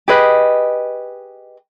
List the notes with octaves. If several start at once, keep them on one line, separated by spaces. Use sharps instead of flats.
G4 G#4 B4 D#5